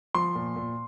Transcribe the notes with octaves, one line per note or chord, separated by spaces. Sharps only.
F3 C6
A#2
A#2